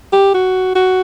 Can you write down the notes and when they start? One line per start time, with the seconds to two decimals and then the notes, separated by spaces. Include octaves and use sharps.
0.13 G4
0.34 F#4
0.75 F#4